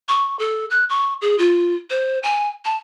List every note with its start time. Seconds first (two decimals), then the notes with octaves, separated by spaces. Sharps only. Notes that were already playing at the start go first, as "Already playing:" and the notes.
0.09 C#6
0.39 A4
0.70 F#6
0.89 C#6
1.22 G#4
1.39 F4
1.90 C5
2.23 G#5
2.65 A5